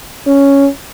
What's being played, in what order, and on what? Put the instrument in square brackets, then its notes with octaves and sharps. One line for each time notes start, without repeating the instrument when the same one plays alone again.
[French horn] C#4